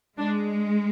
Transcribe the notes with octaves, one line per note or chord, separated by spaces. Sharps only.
G#3 D4